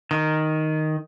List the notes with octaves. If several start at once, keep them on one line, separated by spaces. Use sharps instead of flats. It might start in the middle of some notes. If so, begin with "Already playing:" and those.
D#3